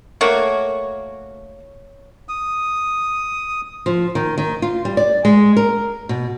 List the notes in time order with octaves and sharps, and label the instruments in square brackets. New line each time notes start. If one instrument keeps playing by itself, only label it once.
[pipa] A3 A#3 F#4 [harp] C#5
[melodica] D#6
[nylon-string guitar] F3
D#3
D#3
F4
G3
D5
G#3
A#4
B2